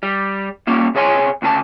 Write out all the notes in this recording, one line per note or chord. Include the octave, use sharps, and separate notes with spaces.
G3
A#2 G3 A#3 C#4
C3 G#4 C#5 G#5 C6
D2 C#3 G#4 A5